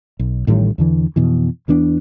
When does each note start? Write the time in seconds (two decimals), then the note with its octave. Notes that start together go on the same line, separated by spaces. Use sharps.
0.19 B1
0.47 A1 A2 D#3 G3
0.78 E2 D3 E3
1.16 F2 B2 E3
1.68 E2 E3 B3 D4